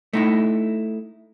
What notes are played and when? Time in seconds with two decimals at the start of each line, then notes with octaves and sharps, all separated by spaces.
0.13 A3 D#4 E4